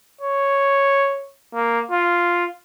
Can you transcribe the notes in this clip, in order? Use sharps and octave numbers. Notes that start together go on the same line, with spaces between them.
C#5
A#3
F4